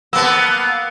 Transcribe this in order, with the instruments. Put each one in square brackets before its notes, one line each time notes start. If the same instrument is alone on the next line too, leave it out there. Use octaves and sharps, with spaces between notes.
[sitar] A#3 B3 [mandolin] A5 E6